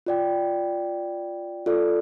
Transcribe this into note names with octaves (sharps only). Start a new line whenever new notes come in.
F4 D5 G5
F4 A4 D5